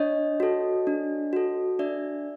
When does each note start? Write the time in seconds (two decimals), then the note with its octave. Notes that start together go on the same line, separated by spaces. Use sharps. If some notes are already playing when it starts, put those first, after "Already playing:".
Already playing: D4 C#5 D#5
0.40 F#4 A4
0.87 D4
1.33 F#4 A4
1.79 D4 D5 E5